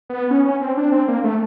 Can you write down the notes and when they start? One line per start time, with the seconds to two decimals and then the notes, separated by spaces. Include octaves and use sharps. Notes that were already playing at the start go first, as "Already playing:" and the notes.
0.10 B3
0.31 C#4
0.45 C#4
0.61 C4
0.77 D4
0.92 C4
1.08 A#3
1.24 A3